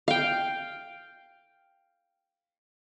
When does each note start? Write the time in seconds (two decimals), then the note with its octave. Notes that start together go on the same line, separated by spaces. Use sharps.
0.08 F5 G5